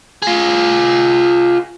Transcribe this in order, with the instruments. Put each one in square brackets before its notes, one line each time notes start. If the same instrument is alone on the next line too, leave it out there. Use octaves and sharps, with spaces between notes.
[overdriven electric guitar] F4 G#4